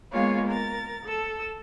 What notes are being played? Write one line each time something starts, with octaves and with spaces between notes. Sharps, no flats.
G#3 A#3 B3 F4 C#5 F5
A#4 A6
A4 E6